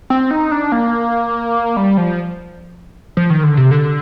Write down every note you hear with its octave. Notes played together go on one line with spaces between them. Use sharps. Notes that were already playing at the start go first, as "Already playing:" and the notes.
C4
D#4
D4
A#3
G3
F3
F3
D#3
D3
C3
D3